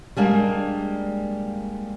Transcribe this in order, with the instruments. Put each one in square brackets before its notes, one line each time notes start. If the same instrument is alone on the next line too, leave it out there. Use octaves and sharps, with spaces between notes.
[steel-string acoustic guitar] G3 G#3 A#3 D4